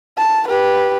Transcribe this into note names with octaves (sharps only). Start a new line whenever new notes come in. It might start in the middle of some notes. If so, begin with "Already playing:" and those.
A5
G4 B4